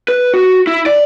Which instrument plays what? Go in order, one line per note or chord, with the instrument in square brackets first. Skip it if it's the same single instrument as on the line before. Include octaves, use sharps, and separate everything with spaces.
[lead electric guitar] B4
F#4
E4
D5